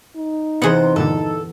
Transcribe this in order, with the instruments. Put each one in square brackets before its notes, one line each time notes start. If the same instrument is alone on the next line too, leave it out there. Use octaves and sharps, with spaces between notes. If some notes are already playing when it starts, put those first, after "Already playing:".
[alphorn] D#4
[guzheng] E2 F#5 [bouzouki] C3 C5 [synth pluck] B3 G#4
[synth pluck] G2 A#2 D3 [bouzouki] A4